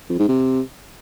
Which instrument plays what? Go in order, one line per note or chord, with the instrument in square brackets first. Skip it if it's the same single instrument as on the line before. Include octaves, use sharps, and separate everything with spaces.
[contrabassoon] F2
G#2
C3